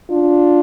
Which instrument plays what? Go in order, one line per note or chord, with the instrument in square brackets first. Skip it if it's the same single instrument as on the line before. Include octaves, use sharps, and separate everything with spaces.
[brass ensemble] D4 F4